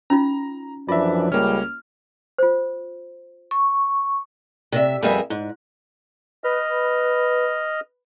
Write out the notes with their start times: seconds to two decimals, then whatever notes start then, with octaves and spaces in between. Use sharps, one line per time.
0.10 C#4 D#4 F4 A#5
0.89 F#2 E3 F3 D4 F4 D5 E5
1.32 C#2 G3 A#3 C#4 F6
2.38 F4 C5
3.51 C#6
4.72 C3 C#5 E5
5.03 F2 G3 B3 G#4 A#4 E5
5.30 G#2
6.44 B4 D#5 F6